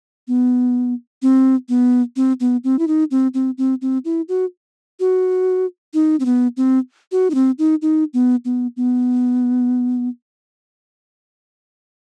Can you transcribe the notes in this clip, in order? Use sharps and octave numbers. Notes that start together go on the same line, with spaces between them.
B3
C4
B3
C4
B3
C4
E4
D#4
C4
C4
C4
C4
E4
F#4
F#4
D#4
C4
B3
C4
F#4
D#4
C4
D#4
D#4
B3
B3
B3